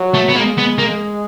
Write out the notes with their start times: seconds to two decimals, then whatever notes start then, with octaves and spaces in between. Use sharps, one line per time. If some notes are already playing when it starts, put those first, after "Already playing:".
Already playing: F#3
0.15 A3
0.29 B3
0.36 G#3 A#3
0.58 B3
0.79 A#3